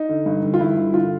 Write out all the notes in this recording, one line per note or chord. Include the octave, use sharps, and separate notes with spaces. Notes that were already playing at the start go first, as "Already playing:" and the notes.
Already playing: D#4
D3
G2
D3
F4
G2 E4
D3
D3 F4